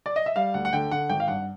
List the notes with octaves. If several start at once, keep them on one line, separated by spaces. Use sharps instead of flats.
D5
D#5
E5
G3 F5
D2 F#5
F#5
D3 G5
D3 F#5
G#1 G5
F5
G2 F#5